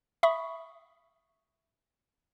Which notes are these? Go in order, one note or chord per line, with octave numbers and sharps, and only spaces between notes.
E5 B5 C#6 D#6